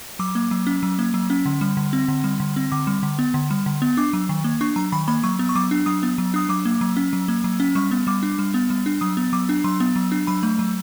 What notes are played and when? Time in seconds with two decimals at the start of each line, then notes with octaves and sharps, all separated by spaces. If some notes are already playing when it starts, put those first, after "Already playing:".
0.19 F#3 D6
0.35 A#3
0.51 F#3
0.67 C#4
0.83 F#3
0.99 A#3
1.14 F#3
1.30 C#4
1.45 D3
1.61 G3
1.77 D3
1.93 C4
2.08 D3
2.24 G3
2.40 D3
2.56 C4
2.72 D3 D6
2.87 G3
3.03 D3
3.19 B3
3.34 D3
3.51 G3
3.66 D3
3.82 B3
3.97 D4 D6
4.13 F#3
4.29 D#3
4.44 A#3
4.61 D4 C#6
4.76 F#3 A#5
4.92 D#3 B5
5.08 A#3 B5
5.23 F#3 C#6
5.39 B3
5.49 C#6
5.55 F#3 D6
5.71 D4
5.86 F#3 D#6
6.03 B3
6.18 F#3
6.34 D4 D#6
6.49 F#3 D6
6.65 A#3
6.81 F#3
6.97 C#4
7.13 F#3
7.28 A#3
7.44 F#3
7.60 C#4
7.75 G3 C#6
7.91 B3
8.07 G3 D6
8.23 D4
8.39 G3
8.54 B3
8.70 G3
8.86 D4
9.01 F#3 D#6
9.17 B3
9.33 F#3 D6
9.49 D4
9.64 F#3 C6
9.80 B3
9.96 F#3
10.12 D4
10.27 F#3 B5
10.43 A3
10.59 F#3